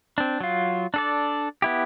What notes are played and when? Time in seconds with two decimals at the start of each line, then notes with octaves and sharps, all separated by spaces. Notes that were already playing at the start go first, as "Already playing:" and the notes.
0.18 C4 D4
0.41 F#3 F4
0.94 D4 A4 D5
1.62 B3 E4 G4